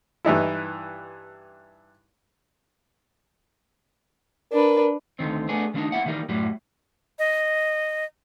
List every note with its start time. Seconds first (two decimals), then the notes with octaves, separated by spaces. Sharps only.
0.25 G2 E3 D#4 E4
4.52 D4 A#4 B4
5.19 D2 D3 D#3 C4
5.48 A3 B3 D4 G#4
5.74 D#3 G3 A#3 C4 D4 D#4
5.92 A#3 E4 E5 F#5
6.06 D#3 E3 G3 A#3
6.29 F#2 A2 F#3 G3
7.19 D#5